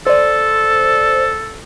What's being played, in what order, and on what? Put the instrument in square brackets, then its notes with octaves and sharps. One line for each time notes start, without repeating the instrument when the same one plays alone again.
[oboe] A4 [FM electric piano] C5 D5